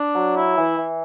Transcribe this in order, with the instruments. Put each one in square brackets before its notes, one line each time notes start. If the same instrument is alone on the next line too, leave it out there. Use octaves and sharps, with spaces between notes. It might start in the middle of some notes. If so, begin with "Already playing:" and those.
Already playing: [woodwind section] D4
F#3
E4
E3
E3